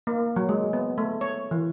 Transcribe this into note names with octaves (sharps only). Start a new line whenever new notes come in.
A#3
F#3
G#3
B3
A3
C#5
E3